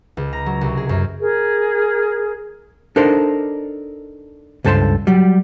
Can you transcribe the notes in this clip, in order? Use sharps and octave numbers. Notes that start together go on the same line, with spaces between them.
C#2
A#5
F#3
C2
G#4
F#2
G#4 A#4
D4 D#4 A4 A#4 C5
C#2 G2 A4 C5 A5 C6
F#3 G3